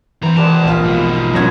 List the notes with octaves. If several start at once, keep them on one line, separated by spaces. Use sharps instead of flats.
D3 E3 C4 A#5
C2 A#2 G#3 B3 G4 A5
A#1 F4
G#2 B2
D#4
F3 F#3 A#3 B3 C#4 G#6